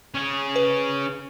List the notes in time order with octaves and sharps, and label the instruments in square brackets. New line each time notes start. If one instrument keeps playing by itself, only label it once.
[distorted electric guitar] C#4 G#4
[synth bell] B4